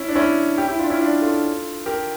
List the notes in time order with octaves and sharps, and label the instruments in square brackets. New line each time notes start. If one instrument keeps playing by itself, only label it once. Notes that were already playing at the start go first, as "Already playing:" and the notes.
Already playing: [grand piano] C#4 E4
D4
C#4 E4
E4 G4
E4 G4
D4 F4
C#4 E4
D4 F4
F4 A4
G4 A#4